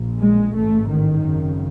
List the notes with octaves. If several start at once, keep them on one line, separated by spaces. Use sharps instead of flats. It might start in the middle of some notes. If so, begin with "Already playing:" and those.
Already playing: A#1 A#2
G#3
A1 G#2 A3
D#3
G#1 F#2 C#3